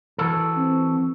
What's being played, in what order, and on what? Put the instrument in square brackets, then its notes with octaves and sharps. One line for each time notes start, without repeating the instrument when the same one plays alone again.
[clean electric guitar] E3 F#4 A4
[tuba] C4